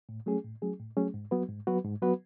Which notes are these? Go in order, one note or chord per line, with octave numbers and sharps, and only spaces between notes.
A2
F#3 A3 C#4 G#4
A2
F#3 A3 C#4 G#4
A2
F#3 A3 C#4 G#4
G#2
F#3 B3 F#4 B4
G#2
F#3 B3 F#4 B4
G#2
F#3 B3 F#4 B4